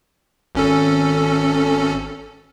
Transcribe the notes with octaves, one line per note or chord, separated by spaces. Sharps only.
G#1 C#4 A4